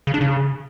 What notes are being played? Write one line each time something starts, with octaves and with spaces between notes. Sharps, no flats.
C#3
D4
C#3